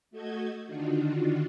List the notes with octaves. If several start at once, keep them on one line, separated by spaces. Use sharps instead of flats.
A3 F#4 A4 D#5 G6 G#6
D3 D#3 D4 D#4 F4 F#4